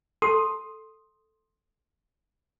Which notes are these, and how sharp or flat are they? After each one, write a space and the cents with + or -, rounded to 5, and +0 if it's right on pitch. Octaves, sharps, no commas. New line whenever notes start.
A4 +0 C6 +10 D#6 +0